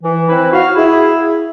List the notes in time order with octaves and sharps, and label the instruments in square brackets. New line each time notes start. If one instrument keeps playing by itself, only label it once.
[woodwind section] E3
C4 E4 B4
F#4 F5
E4 G#4